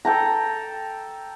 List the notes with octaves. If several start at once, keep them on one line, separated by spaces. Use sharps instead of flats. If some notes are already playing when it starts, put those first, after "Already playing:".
A4 G5 A5 A#5